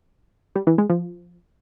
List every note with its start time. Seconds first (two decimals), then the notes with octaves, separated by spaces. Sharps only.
0.55 G3
0.67 E3
0.78 G#3
0.90 F3